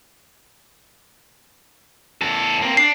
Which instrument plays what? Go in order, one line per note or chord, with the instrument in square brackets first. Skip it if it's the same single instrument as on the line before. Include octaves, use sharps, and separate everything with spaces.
[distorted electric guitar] E2 A4
A#3 C4
[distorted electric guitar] D4 [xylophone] C7